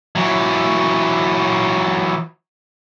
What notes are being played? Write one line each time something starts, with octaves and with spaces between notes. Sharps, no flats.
E3 F#3